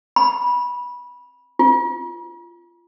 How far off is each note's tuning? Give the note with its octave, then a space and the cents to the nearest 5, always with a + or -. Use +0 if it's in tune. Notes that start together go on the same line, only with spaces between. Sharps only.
B5 -20
F4 -20